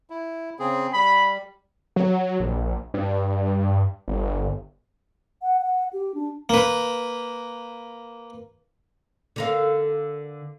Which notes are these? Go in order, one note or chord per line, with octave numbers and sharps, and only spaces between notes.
E4
C#3 C4 G#4
G3 B5
F#3
A#1
G2
G1
F#5
F#5
G4
D4
A#3 B4
D3 A#4 F5